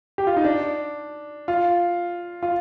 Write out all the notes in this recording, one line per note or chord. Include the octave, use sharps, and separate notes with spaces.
G4
F4
D#4
D4
F4
F4